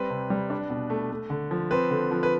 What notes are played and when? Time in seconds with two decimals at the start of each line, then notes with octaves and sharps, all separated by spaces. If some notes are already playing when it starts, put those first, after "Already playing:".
Already playing: G3 C4 B4
0.10 C3
0.30 G3
0.50 D4
0.70 B2
0.90 A3
1.11 A3
1.30 D3
1.51 F3
1.71 C4 B4
1.91 D3
2.11 F3
2.23 B4